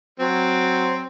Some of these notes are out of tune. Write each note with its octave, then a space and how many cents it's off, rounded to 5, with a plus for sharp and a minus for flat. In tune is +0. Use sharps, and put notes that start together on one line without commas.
F#3 +0 C4 +0